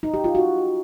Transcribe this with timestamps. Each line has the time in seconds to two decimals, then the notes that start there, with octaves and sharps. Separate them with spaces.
0.03 D#4
0.14 G4
0.24 F4
0.35 F#4